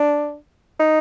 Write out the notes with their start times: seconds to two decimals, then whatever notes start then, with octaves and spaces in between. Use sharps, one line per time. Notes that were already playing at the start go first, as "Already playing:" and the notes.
Already playing: D4
0.80 D#4